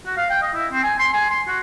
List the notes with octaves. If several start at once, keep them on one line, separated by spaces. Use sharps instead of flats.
F#4
F5
G5
D#5
E4
C4
G#5
C6
G#5
C6
F#4